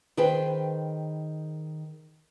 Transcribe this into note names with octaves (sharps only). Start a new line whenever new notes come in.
D#3 G#4 B4 C5 G5